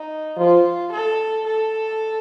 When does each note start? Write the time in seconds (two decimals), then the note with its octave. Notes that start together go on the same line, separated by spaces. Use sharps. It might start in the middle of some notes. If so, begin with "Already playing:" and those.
Already playing: D#4
0.39 F3 F4
0.92 A4
1.46 A4